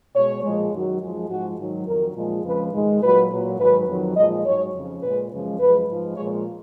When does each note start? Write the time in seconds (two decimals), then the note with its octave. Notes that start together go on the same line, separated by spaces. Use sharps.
0.15 B2 G#3 C#5
0.43 A#2 F3 G#3
0.72 F#2 D#3 F#3
1.01 F#2 F3 G#3
1.30 G#2 F3 G#3 F#4
1.58 G#2 D#3 F#3
1.87 F2 D#3 F#3 A#4
2.16 A#2 F3 G#3
2.44 F2 C#3 F3 G#3 B4
2.73 G#2 D#3 G#3
3.02 A#2 F#3 B4
3.31 A#2 F#3
3.59 G#2 D#3 F#3 B4
3.88 F2 D#3 F#3
4.16 A#2 F3 G#3 D#5
4.45 G#2 F#3 C#5
4.74 F2 C#3 F3
5.03 A#2 G#3 B4
5.31 F#2 C#3 F3 G#3
5.59 F#2 F3 G#3 B4
5.88 G#2 F3 G#3
6.16 A#2 F3 G#3 C#5